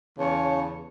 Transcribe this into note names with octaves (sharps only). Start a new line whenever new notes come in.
E2 C#3 C#5 A5